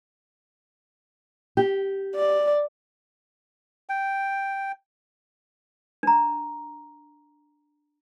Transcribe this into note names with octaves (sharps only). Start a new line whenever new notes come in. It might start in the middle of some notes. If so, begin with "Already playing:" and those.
G4
D5
G5
D4 A#5